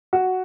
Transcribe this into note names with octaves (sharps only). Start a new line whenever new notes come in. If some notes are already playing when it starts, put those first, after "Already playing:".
F#4